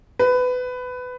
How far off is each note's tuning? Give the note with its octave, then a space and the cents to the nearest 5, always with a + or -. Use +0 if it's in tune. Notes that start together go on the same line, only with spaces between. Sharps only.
B4 +20